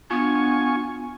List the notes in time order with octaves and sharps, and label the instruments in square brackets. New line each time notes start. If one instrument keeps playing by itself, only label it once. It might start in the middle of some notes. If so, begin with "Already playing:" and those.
[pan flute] B3 [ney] D4 [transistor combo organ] F4 G#5 C#6